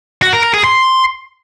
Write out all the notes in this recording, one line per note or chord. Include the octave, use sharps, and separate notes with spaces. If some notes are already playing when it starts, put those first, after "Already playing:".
F#4
A#4
A#4
G#4
C6